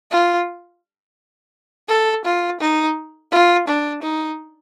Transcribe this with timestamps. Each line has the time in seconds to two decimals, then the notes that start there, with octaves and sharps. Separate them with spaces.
0.11 F4
1.89 A4
2.25 F4
2.60 D#4
3.32 F4
3.68 D4
4.02 D#4